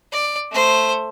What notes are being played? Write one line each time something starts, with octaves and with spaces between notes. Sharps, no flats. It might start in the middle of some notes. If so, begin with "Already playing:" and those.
D5
A3 C5